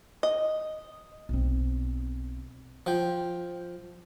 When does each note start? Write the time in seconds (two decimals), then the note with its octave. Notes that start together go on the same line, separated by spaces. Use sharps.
0.23 D#5
1.29 B1 C4
2.86 F3 G5